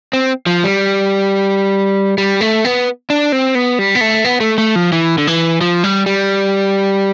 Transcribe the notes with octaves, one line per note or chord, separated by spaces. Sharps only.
C4
F3
G3
G3
A3
B3
D4
C4
B3
G3
B3
A3
B3
A3
A3
F3
E3
D3
E3
F3
G3
G3